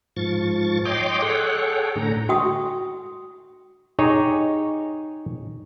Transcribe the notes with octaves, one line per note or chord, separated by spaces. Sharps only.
G#2 F3 C#6 A6
C#5 D#5 G5 C6 D6
G#4 A4 C#5 F#5 G5
A2 D3 A#5
F#4 G5 C#6 D#6
D#4 G4 G#4 C#5